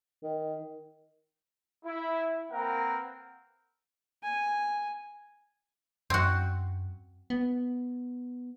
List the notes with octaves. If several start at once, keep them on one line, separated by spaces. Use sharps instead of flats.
D#3
E4
A#3 C4 A#4 B4 F#5 G5
G#5
F#2 C4 F#4
B3